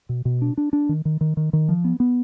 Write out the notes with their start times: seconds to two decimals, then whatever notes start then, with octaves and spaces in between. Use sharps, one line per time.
0.09 B2
0.25 B2
0.42 D4
0.58 D4
0.73 D4
0.89 D#3
1.05 D#3
1.21 D#3
1.37 D#3
1.53 D#3
1.69 F3
1.84 B3
2.00 B3